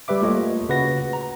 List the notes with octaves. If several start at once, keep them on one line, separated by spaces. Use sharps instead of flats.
G3 G4 B4 E5 D6
A3 A#3 F4 A4 C#5 D#5
C#3 F#4 B4 F#5 A#6
A#5